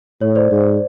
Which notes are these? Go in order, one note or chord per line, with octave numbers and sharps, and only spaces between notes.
A2 C#5
C5 D5
G#2